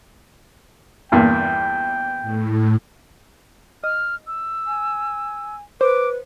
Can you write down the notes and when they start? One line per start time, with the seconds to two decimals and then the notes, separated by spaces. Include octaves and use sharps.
1.12 E2 G2 A#2 G5
2.22 A2
3.84 D#5 F6
4.27 E6
4.67 G#5
5.81 B4 C5 D6